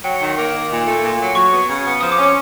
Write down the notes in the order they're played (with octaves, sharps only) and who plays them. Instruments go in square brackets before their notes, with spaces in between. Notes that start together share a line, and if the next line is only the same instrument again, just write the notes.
[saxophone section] F#3 [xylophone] G5
[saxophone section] D#3
A#3
D#3
A#2
A3
A#2
F#3
[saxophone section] F#3 [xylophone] C#6
[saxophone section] B3
C#3
B3
[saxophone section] F3 [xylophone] D#6
[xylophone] D6
[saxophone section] C#4
[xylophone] D6